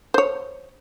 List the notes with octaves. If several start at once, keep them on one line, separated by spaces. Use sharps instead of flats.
C5 C#5